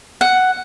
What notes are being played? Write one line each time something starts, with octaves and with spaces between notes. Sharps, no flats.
F#5